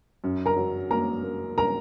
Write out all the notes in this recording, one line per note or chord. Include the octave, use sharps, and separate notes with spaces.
F#2
A#4 A#5
F#3
A#3 A#4 A#5
A#3
A#4 A#5